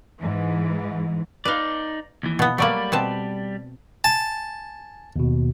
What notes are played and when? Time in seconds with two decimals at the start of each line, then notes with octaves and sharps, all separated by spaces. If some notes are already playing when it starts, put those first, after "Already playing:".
0.20 G#2 E3
1.45 D#4 B4 D5 F5
2.23 D#2 E3
2.39 B2 B3
2.58 F#3 G3 A3 A#3 D5 B5
2.92 B2 C4 A5
4.04 G#5 A5
5.16 D#2 B2